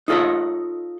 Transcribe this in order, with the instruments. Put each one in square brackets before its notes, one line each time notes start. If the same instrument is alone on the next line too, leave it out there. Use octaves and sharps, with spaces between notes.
[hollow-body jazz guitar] D#4 F4 A4 C#5 D#5